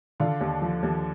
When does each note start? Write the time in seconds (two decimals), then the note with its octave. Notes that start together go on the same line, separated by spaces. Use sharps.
0.20 D3 F4
0.41 D#2
0.62 F3
0.83 D#2